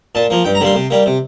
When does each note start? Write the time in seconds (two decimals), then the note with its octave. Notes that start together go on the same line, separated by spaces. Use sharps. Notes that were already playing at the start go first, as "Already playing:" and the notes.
0.15 A#2 A5
0.30 F3 A#3
0.44 G2 G5
0.55 A#5
0.60 D3 G3 A#3 C6
0.75 C3
0.90 G3 A#3
1.06 C3